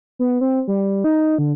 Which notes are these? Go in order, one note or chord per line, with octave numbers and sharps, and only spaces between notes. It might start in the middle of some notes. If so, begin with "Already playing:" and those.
B3
C4
G3
D#4
D3